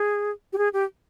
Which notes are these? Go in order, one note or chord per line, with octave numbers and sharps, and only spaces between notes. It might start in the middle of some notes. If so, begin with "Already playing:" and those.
Already playing: G#4
G4
G#4
G4